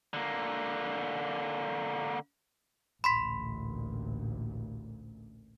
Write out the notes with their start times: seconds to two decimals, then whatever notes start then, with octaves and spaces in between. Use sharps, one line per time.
0.14 D3 A#3
3.04 A1 D2 A#2 B5 C6 B6